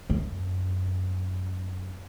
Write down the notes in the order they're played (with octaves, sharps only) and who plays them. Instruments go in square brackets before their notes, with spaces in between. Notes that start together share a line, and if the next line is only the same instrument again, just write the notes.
[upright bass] F#2